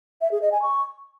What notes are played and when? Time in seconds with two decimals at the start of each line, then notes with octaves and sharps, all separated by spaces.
0.21 E5
0.32 G#4
0.42 D#5
0.52 G#5
0.62 C#6